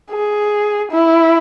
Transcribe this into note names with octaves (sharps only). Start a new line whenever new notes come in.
G#4
E4